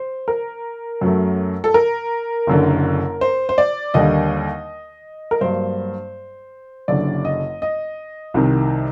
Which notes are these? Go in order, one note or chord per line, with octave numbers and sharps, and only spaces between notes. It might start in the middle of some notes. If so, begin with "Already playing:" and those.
Already playing: C5
A#4
F#2 F#3 A3
A4
A#4
F#1 F#2 D3
C5
C5
D5
D#2 D3 G3 A#3 D#5
A#4
G2 F#3 A#3 C5
F#1 F#2 D3 D5
D#5
D#5
C2 C3 D#3